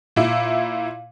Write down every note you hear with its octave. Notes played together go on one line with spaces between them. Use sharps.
A#2 E4